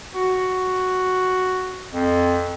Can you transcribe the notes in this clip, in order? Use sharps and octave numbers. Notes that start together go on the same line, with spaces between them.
F#4
F2